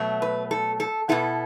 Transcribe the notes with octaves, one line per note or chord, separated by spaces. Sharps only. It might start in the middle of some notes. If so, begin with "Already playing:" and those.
Already playing: B2 F#3 A3
B4
A4
A4
B2 B3 E4 A4